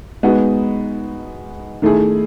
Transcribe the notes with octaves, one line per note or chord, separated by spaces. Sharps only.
G#3 B3 D#4 F#4
D#3 A3 E4 G#4